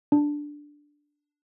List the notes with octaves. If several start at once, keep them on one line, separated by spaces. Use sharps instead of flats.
D4